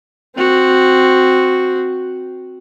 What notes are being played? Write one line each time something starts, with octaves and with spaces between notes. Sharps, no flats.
C4 F#4